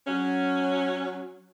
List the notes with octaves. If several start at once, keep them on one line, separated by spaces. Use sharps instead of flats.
F#3 C#4